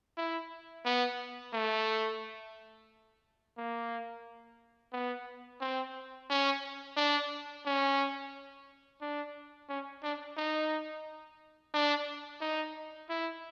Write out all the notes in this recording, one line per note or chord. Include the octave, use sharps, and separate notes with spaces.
E4
B3
A3
A#3
B3
C4
C#4
D4
C#4
D4
C#4
D4
D#4
D4
D#4
E4